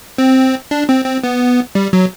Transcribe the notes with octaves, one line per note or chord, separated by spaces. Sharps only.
C4
D4
C4
C4
B3
G3
F#3